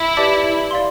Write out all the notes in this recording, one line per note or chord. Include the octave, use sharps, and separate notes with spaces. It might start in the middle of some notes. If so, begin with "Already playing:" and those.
Already playing: E4
G4 B4 D5 A5 D6
D5 F5 C6